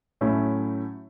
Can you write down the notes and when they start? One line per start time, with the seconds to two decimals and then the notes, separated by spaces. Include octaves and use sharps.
0.21 A2 F#3 A3 C#4 E4